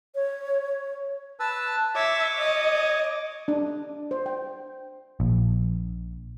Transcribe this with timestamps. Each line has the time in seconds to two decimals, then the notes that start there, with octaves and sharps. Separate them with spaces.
0.15 C#5
1.40 B4 A5 E6
1.95 C#5 E5 C#6 D6
2.38 D#5
3.48 D4
4.11 C5
4.26 G5
5.20 A#1